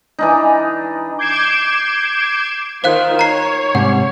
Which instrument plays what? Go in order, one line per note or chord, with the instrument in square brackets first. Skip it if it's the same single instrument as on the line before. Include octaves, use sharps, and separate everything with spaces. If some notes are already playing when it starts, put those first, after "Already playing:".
[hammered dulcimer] E3 D4 D#4
[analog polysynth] D6 G6 G#6 C7 D7 E7
[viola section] D#3 F4 [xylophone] C5 F5 F#6
[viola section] C#5 [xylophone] A#5 C7
[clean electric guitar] G#2 C3 G3 [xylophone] F#5